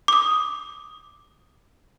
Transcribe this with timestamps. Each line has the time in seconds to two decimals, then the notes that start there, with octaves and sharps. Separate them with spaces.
0.08 D6 D#6